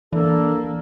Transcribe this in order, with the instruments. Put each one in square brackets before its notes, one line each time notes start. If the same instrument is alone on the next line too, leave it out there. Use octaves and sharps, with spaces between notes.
[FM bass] E3 [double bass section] A#3 [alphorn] D4 [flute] A4